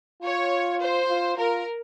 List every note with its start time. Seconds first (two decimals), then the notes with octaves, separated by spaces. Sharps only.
0.22 F4 C#5
0.80 C5
1.09 F4
1.37 F4 A#4